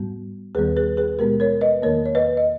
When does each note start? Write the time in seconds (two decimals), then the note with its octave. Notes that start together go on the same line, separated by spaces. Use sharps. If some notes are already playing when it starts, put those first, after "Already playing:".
Already playing: G#2 G3 B3
0.55 D#2 D#3 G3 B3 G#4 B4
0.77 G#4 B4
0.97 G#4 B4
1.19 B2 G#3 B3 G4 A#4
1.40 A#4 C#5
1.61 B4 D#5
1.82 E2 D#3 A#3 A#4 C#5
2.06 C#5
2.15 B4 D#5
2.37 D#5